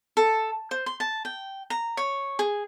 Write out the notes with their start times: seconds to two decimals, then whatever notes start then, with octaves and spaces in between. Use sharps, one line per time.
0.17 A4
0.71 C5
0.86 C6
1.00 A5
1.25 G5
1.70 A#5
1.97 C#5
2.39 G#4